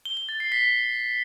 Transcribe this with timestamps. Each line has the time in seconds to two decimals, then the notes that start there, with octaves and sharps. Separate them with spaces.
0.05 G7
0.17 G7
0.29 A6
0.40 C7
0.52 B6